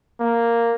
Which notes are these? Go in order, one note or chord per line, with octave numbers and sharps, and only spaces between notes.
A#3